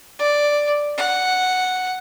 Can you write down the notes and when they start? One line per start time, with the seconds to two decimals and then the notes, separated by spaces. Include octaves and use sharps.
0.19 D5
0.98 F#5